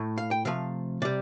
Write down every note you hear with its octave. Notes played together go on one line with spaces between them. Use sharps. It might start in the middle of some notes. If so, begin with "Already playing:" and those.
Already playing: A2 A3
F5
G5
C3 F3 A3 F5
C3 G3 D5